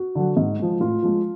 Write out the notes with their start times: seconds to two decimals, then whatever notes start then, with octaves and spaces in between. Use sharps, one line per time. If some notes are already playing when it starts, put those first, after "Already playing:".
Already playing: F#4
0.15 D3 F#3
0.37 G#2
0.59 F3 G#3
0.80 A2 F4
1.03 F3 G#3